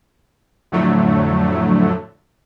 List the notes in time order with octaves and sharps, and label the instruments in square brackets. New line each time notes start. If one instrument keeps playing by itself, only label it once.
[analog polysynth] F2 A2 D3 F#3 A3